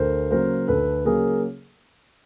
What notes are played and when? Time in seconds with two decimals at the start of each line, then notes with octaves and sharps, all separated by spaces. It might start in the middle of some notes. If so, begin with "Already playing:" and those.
Already playing: D2 A#4 C5
0.31 C#3 F#3 A#3 C#4 A#4 C5
0.68 D2 A4 B4
1.05 C#3 F#3 A#3 C#4 G#4 A#4